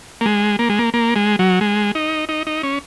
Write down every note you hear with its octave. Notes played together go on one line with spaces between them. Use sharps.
A#3
G#3
A#3
G#3
A#3
A#3
G#3
F#3
G#3
D#4
D#4
D#4
C#4